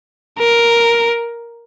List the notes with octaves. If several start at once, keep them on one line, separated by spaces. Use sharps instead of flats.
A#4